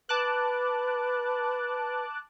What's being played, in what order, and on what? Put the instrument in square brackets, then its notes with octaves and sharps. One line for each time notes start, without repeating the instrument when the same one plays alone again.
[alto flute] B4 [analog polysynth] A5 D6 F#6